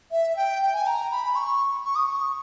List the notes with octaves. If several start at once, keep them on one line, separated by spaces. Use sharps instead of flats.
E5
G5
G5
G#5
A#5
B5
C#6
C#6
D#6
C#6